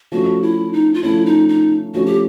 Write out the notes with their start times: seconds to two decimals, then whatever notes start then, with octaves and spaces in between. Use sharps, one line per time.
0.12 F3 A3 C#4 F#4
0.42 E4
0.73 D#4
0.94 F4
1.03 F3 A3 C#4 E4
1.26 D#4
1.49 D#4
1.94 F3 A3 C#4 F#4
2.06 G4